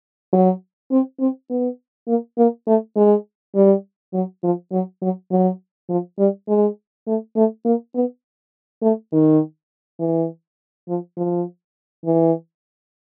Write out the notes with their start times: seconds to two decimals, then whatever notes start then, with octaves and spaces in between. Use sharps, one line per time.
0.33 F#3
0.91 C4
1.20 C4
1.50 B3
2.08 A#3
2.38 A#3
2.67 A3
2.97 G#3
3.55 G3
4.14 F#3
4.43 F3
4.72 F#3
5.02 F#3
5.31 F#3
5.90 F3
6.18 G3
6.49 G#3
7.07 A3
7.36 A3
7.65 A#3
7.95 B3
8.82 A3
9.12 D#3
10.00 E3
10.89 F3
11.17 F3
12.05 E3